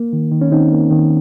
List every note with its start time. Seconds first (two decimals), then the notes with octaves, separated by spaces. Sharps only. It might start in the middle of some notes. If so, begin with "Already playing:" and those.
Already playing: A#3
0.13 D#3
0.32 D#3
0.41 C#4
0.52 D#3 C4 D#4
0.72 A#3
0.91 D#3